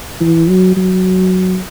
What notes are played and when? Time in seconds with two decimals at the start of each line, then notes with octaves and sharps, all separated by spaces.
0.21 E3
0.49 F#3
0.76 F#3